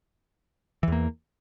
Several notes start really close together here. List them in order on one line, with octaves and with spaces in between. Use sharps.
E3 E2 A#3